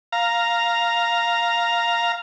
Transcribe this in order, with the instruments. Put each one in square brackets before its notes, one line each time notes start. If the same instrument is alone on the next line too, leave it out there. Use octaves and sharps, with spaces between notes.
[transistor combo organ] F5 A#5